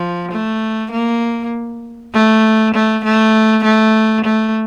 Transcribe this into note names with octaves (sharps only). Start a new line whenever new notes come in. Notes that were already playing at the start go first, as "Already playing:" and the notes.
Already playing: F3
A3
A#3
A3
A3
A3
A3
A3